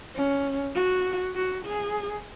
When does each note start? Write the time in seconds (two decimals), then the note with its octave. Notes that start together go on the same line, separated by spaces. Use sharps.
0.15 C#4
0.75 F#4
1.35 F#4
1.66 G#4